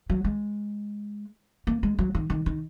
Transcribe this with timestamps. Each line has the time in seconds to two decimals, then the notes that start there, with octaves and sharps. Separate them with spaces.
0.10 F#3
0.24 G#3
1.67 A#3
1.83 G#3
1.99 F#3
2.15 D#3
2.30 D#3
2.46 D#3